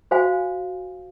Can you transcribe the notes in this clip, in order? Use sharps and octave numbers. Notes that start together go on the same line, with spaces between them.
F#4 C5 F5 G#5